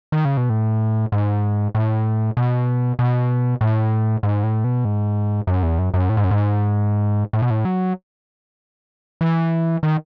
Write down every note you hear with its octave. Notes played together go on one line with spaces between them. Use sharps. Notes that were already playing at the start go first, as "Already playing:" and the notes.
D#3
C#3
B2
A2
G#2
A2
B2
B2
A2
G#2
A2
B2
G#2
F#2
E2
F#2
F#2
A2
G#2
F#2
G#2
A2
B2
A2
F#3
E3
D#3